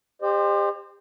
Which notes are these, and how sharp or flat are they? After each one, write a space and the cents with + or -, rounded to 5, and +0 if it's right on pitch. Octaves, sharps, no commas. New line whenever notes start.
G4 +35 C5 +0 D#5 -40